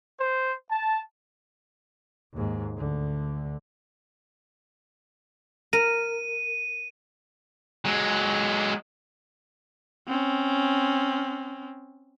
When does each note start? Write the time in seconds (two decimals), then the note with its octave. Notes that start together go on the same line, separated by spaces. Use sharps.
0.20 C5
0.70 A5
2.33 D#2 G#2
2.77 D2 D3
5.73 A#4 D#7
7.85 F#3 G#3
10.07 C4 C#4